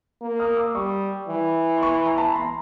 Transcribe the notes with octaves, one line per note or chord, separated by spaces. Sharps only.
A#3
D#6 F6
D6 E6
G3 C#6 D#6
E3
C6
B5 C#6
A#5
A5 B5
A#5 C6